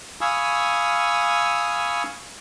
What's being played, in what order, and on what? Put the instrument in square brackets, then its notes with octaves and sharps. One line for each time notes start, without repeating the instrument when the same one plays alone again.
[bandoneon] F5 G#5 B5 C#6 D#6 E6